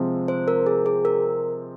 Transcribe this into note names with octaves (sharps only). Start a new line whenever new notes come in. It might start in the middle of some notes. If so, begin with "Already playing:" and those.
Already playing: C3 F3 G#3 C4
C5
A#4
G#4
G#4
A#4